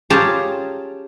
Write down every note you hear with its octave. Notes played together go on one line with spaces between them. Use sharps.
C#4 F4 G4 G#4 A5 A#5